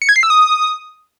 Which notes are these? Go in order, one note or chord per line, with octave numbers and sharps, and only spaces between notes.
C#7
G#6
C7
E6
D#6